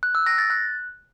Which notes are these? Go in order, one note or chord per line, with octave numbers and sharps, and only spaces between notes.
F#6
E6
A#6
A6
F#6